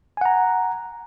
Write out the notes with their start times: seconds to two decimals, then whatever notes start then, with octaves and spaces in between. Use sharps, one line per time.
0.17 G#5
0.21 F#5
0.25 A#5